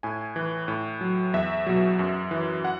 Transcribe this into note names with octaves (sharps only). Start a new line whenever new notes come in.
A2 G#5
E3
A2
F#3
E2 E5
B2 F#3
F#2
E3
F#5